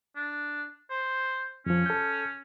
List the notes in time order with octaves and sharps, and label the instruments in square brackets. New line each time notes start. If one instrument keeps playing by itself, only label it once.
[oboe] D4
C5
[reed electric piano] F2 F3 [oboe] C#4
[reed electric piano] A4 G6